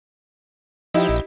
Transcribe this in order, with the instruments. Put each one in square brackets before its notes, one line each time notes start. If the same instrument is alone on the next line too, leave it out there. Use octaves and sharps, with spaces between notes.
[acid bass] F3 [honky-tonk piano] D#4 E4 G4
[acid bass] A#1